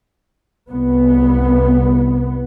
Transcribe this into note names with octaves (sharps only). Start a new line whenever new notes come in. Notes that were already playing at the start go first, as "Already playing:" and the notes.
C2 B3